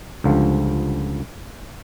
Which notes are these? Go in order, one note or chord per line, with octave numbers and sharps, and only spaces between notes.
C#2 D3 F3 G3